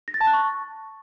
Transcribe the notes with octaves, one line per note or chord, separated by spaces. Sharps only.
A#6
A6
A5
F#6
C#6